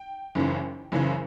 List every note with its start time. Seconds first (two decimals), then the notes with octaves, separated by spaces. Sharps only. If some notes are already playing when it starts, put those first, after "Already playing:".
Already playing: G5
0.35 F#1 F#2 C#3 E3
0.92 F#1 F#2 C#3 E3